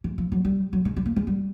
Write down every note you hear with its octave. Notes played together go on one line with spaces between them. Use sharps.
E3
F3
F#3
G3
F#3
G#3
G3
A#3
G#3
G3